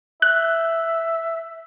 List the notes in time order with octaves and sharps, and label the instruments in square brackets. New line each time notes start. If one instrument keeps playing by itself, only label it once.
[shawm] E5 [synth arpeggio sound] F#6